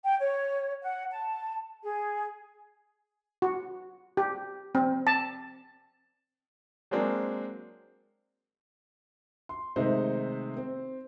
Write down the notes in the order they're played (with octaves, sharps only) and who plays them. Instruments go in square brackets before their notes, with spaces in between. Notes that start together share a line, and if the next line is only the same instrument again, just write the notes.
[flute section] G5
C#5
F#5
A5
G#4
[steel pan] F#4
G4
C4
A5
[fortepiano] F#3 G#3 A#3 C4 D4
[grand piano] C6
C3 D#3 G#3 A3 D#4 C5
C4